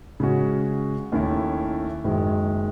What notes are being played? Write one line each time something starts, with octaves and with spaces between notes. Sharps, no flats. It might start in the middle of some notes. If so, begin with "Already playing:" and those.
C#3 G#3 C#4 F#4
D#2 D#3 A3 C#4 E4
F#1 F#2 D#3 G#3